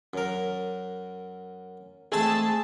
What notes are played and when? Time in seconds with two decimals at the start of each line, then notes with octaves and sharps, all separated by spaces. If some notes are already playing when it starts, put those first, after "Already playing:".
0.14 F#2 A#4
2.12 G#3 A3 C4 G#4 A5